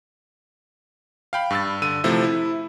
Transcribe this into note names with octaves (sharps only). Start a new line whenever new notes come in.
F5 G5 B5
G2 E6 A6
D3 E6 D#7
C3 F3 A3 E4
E4